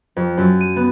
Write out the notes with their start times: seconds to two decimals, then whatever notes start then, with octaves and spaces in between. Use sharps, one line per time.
0.16 F2
0.37 F#2
0.60 D#7
0.76 B3